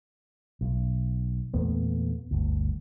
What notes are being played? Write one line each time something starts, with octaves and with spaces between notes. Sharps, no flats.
B1
E2 A#2 A3 B3
G1 D2